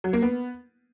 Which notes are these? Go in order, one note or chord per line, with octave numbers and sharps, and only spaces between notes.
F#3
A#3
B3